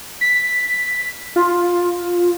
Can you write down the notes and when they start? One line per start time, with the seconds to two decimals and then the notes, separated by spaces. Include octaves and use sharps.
0.21 B6
1.36 F4